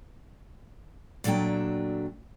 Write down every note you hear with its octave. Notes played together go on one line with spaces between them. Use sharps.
A#2 F#3 A3 D4 G5